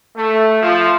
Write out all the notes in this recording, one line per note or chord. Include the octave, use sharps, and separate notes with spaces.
A3
F3